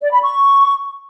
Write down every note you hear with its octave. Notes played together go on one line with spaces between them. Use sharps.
D5
B5
C#6